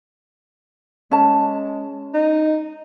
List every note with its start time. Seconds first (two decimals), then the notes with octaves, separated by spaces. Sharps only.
1.11 G#3 C#4 A5
2.14 D#4